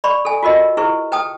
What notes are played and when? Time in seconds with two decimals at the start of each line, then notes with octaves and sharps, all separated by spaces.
0.04 D5 B5 C#6
0.25 A4 G#5
0.43 F4 F#4 A#4 D#5
0.77 E4 G#4 B4 C#6
1.12 B4 G5 A5 D#6